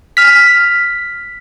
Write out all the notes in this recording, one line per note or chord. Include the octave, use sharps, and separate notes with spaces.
F6 B6